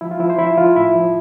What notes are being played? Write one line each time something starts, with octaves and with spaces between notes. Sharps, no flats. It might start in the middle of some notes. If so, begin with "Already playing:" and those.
F3 E4
F4
F3 E4
C5
F3 E4
F3 F4
A2 E4
F3